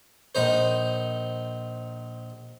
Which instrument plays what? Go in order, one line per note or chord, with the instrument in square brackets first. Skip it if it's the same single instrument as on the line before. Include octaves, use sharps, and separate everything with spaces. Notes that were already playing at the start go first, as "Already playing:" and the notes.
[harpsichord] A#1 D#4 C5